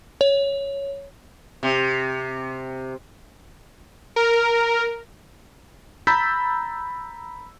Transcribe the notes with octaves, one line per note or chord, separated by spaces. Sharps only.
C#5
C3
A#4
A#5 B5 E6 G6 A6 B6